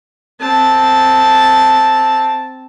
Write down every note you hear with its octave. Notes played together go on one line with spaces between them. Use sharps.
C4 A5